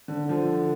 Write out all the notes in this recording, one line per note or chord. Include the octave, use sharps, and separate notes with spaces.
D3
D3
F3